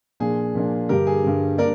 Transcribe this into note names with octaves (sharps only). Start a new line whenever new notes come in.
A#2 F3 A#3 D4 G#4
A#2 F3 A#3 D4
G2 D3 G3 G4 A#4
G#4
G2 D3 G3
G3 A#3 D4 A#4 D5